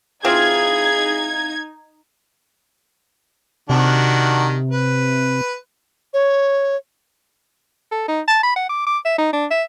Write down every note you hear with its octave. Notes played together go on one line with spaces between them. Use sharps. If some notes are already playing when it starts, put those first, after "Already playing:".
E3 C4 D#4 F4 G#4 G#6
C3 D#3 D4 F#4
B4
C#5
A4
D#4
A5
B5
F#5
D6
D6
E5
D#4
D4
E5